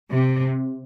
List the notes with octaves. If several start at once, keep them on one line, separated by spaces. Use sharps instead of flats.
C3